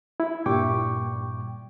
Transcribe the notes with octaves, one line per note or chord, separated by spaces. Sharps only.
E4
G2 A#2 G3 G5 C#6 D6